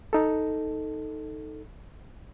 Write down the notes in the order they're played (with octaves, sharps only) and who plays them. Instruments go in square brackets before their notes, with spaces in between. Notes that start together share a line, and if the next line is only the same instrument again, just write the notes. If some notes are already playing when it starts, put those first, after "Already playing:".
[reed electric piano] D#4 A4